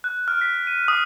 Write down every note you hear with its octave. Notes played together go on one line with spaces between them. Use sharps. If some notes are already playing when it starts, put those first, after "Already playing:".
F#6
F6
B6
D#7
D#6